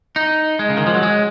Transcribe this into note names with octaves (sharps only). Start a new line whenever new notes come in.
D#4
G#3
C#3
D#3
F3
F#3
G#3